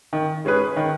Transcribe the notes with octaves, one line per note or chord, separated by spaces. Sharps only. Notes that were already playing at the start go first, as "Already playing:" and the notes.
D#3
G#3 C#4 G#4 B4
D#3